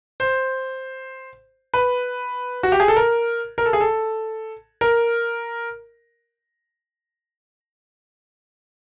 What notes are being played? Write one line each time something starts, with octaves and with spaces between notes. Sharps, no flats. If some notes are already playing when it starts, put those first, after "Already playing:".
C5
B4
F#4
G4
G#4
A4
A#4
A#4
A4
G#4
A4
A#4